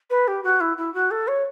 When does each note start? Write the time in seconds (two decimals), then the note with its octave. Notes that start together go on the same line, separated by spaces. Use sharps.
0.10 B4
0.27 G4
0.44 F#4
0.60 E4
0.77 E4
0.94 F#4
1.11 A4
1.28 C#5